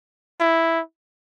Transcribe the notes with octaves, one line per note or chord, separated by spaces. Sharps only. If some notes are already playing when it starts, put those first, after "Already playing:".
E4